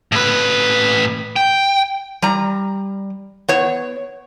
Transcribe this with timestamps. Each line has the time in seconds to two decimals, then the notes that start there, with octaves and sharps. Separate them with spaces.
0.12 A2 B4
1.36 G5
2.22 G3 A#5
3.48 B3 C#5